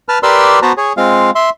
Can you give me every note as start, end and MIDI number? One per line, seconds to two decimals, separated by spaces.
0.09 0.19 71
0.09 0.19 81
0.09 0.19 89
0.23 0.59 67
0.23 0.59 70
0.23 0.59 71
0.23 0.59 74
0.23 0.59 84
0.23 0.59 88
0.62 0.72 59
0.62 0.72 66
0.62 0.72 71
0.62 0.72 72
0.62 0.72 81
0.62 0.72 82
0.77 0.93 68
0.77 0.93 73
0.97 1.30 56
0.97 1.30 60
0.97 1.30 65
0.97 1.30 77
1.35 1.50 76
1.35 1.50 84